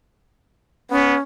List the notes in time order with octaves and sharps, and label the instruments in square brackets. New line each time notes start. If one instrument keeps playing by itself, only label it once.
[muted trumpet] B3 [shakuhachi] C#4